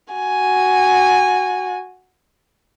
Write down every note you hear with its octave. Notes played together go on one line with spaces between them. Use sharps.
F#4 G#5